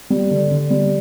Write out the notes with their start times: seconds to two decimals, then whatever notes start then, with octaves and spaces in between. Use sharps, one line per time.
0.10 G3
0.31 D3
0.51 D3
0.70 G3